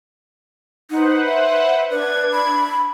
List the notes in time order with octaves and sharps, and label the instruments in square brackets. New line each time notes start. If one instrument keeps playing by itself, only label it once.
[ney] D#4 [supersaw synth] B4 C5 F#5
[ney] E5
[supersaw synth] D4 G#6 [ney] B4
[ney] B5